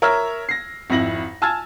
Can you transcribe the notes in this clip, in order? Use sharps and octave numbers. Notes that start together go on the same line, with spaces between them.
A#4 C#5 E5 E6 F6 G#6
A#6 C7
G#1 F2 E4 A#6 F#7
G#5 A5 E6 F6 G#6 A6